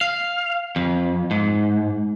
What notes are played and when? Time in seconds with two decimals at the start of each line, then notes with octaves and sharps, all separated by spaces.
0.01 F5
0.76 F2
1.31 G#2